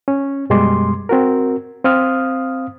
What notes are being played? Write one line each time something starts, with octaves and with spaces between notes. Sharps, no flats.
C#4
F#2 B2 G3 G#3 C6 D6
C4 F#4 A#4
C4 C5 F5 D#6 F6